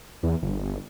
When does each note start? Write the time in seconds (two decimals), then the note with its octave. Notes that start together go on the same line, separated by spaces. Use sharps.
0.23 E2
0.42 G1